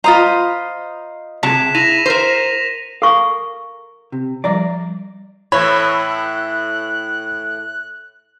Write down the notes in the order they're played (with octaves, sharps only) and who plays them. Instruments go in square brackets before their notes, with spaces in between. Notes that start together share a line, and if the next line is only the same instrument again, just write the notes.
[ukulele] F4 A#5 [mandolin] C5 D#5 B5
[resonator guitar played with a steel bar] C3 [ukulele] G#4 A5 [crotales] B6 E7
[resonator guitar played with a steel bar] E4 [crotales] A#6 D#7 F7
[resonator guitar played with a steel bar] A#4 C5
[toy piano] A4 C#6 [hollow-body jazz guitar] A#4 F5
[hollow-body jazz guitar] C3
[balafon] F3 G3 [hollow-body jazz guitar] D5 A#5
[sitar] A2 E3 [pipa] C#5 [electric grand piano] B5 [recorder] F#6